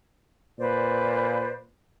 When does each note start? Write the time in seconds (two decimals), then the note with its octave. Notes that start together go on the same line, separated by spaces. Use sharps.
0.60 A#2 B4 C5 D5